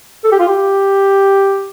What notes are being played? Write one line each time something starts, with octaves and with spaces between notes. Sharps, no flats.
A4
G4
F4
G4